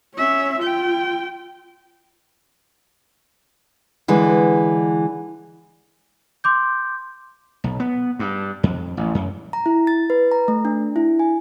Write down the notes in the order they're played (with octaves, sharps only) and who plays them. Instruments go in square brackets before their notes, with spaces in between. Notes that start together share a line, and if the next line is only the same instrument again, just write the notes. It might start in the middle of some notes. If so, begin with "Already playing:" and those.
[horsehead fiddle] C#4 E5
F4 G5
[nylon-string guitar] D3 E3 G#3
[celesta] C6 D6 G6
[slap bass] B1
B3
G2
F2
A1
F#2
[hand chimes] A#5
E4
A6
B4
A#5
A3
D4
E4
G#5